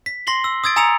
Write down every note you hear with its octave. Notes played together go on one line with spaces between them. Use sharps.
B6
C6 A#6 C7 F#7 G7
E6
D#6 E6 G#6 A6 D7
G#5 A#5 D#6 E6 C#7 F7